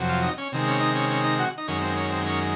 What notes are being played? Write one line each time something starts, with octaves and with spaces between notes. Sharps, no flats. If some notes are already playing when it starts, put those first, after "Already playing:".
Already playing: F2 C3 F#3
F4
D#4
C#4
C3 D#3 G#3
C#4
D#4
C#4
C#4
D#4
F#4
D#4
F#2 D#3 G#3 C#4
C4
C#4
C4
C#4